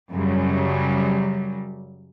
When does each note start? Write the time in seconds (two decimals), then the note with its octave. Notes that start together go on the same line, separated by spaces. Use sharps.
0.12 F#2 C#3 F#3 G3